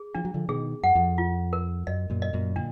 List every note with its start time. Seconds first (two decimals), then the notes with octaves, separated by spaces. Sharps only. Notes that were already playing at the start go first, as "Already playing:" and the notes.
Already playing: G#4
0.15 F3 D4
0.25 F#3
0.34 D3 F3
0.49 B2 D#3 G#4
0.83 F#2 F#5
0.95 F2
1.18 F4
1.53 A#4
1.87 F#2 D#5
2.10 F#2 A#2
2.22 D#5
2.33 F#2 A#2
2.56 A#2 D3 D4